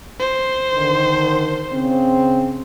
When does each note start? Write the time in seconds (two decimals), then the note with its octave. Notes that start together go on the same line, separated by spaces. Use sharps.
0.19 C5
0.75 D3 D#3
1.72 C#3 C4